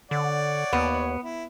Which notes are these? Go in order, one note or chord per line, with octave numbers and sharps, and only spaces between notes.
D3 C#5 D5 F#5
D#2 B3
E4